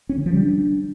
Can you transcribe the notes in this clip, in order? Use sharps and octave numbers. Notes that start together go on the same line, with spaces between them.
C#4
D3
F3
G3
D4